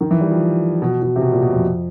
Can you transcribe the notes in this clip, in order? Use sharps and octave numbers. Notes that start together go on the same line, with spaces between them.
D#3
E3
G3
F3
B2
B2
C3
B2
A#2
B2
F2